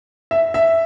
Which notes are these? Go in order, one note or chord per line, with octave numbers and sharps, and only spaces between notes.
E5
E5